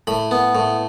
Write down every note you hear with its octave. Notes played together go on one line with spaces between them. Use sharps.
A2 B5
B3
A2